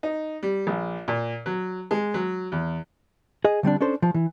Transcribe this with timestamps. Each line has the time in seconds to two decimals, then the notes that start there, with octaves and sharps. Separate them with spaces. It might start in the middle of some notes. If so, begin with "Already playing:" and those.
0.03 D#4
0.43 G3
0.67 A#1
1.08 A#2
1.46 F#3
1.91 G#3
2.14 F#3
2.52 E2
3.45 G#4 D#5
3.63 D3 G3 C4 D4
3.81 C#4 D4 A4 C5
4.02 F3
4.14 E3